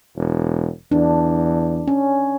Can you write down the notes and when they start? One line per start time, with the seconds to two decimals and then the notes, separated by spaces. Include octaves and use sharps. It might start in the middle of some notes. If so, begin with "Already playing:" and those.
0.16 E1
0.91 E2 D4
1.88 C#4